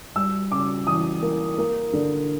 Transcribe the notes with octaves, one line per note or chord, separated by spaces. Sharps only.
G3 E6
C#3 D6
E3 D#6
A#3
A#3
D3